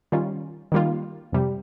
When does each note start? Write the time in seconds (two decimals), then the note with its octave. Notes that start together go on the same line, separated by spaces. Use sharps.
0.12 D#3 G3 C#4 F4
0.72 D#3 G3 A#3 F4
1.32 F2 C3 G3